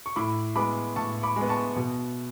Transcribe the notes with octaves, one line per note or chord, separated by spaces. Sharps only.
C#6
A2 B5 D6
G#3 B3 B5 D6
A2 A5 C#6
B5 D6
G#3
B3
A5 C#6
B2